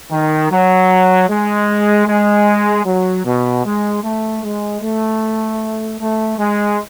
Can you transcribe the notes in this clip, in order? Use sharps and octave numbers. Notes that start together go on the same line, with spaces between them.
D#3
F#3
G#3
G#3
F#3
B2
G#3
A3
G#3
A3
A3
G#3